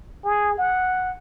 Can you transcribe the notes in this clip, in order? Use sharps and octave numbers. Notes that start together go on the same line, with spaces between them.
G#4
F#5